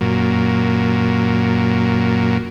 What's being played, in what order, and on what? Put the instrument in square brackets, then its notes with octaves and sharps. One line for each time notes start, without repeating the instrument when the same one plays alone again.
[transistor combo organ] F#2 A#2